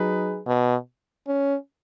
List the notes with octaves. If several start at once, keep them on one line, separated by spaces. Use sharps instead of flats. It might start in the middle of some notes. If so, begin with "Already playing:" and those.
Already playing: F#3 D#4 G#4 B4
B2
C#4